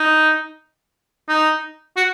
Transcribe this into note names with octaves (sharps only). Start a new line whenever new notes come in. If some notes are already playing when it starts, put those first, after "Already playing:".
Already playing: D#4
D#4
F#4